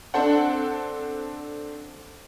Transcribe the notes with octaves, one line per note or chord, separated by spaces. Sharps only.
C4 D4 A4 C5 F#5